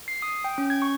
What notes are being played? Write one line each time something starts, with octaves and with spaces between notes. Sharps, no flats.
C7
D#6
G5
C#4
G#6
C#6